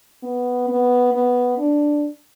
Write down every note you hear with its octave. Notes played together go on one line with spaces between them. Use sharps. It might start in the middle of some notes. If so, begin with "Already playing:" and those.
B3
B3
B3
D4